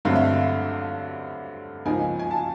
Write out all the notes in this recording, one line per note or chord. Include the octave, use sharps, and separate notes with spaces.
G2 D3 F#3 A3 C4 F5
E5
F5
C#2 C#3 F3 A#3 D#4 G#5
G#5
A5